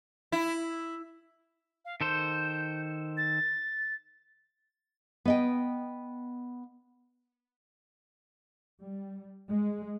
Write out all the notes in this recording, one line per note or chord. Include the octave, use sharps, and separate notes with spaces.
E4
F5
D#3 A4 C5 G6
A6
B3 D#5 G5
G3
G#3